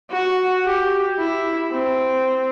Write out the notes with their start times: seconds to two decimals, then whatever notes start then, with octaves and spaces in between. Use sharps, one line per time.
0.11 F#4
0.65 G4
1.19 E4
1.71 C4